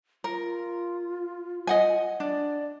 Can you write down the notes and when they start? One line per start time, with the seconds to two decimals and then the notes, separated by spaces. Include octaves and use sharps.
0.24 F4 A#4
1.67 D#5 F#5 G#5
2.20 D4 D5